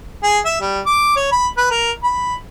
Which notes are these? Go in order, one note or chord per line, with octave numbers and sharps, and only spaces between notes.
G#4
E5
G3
D6
C#5
B5
B4
A#4
B5